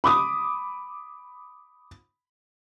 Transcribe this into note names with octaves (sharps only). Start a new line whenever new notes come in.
B5 D6 D#6